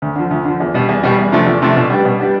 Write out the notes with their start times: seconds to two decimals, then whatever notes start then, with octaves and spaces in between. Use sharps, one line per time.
0.02 D2
0.16 D3 F3
0.31 D2
0.45 D3 F3
0.60 E2
0.74 B2 G3
0.89 E2
1.03 B2 G3
1.18 E2
1.32 C3 F3 A3 D4
1.46 E2
1.62 C3 F3 A3 D4
1.76 B2
1.90 G3 B3 D4 G4
2.05 B2
2.20 G3 B3 D4 G4